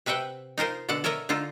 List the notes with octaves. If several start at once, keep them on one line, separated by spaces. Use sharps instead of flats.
C3 B4 E5 F#5 G5
D#4 F4 A#4 C5
B2 D3 A4 F#5
A4 A#4 C#5 D#5 E5
D3 D#4 F4 A4